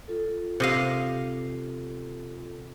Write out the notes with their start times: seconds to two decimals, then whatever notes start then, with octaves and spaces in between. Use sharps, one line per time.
0.08 F4 A4
0.60 C3 D#5 F5